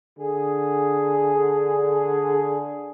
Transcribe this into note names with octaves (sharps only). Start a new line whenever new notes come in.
D3 G#4